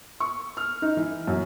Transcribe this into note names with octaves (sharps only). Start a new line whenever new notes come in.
C#6
F6
D#4
E3
F#2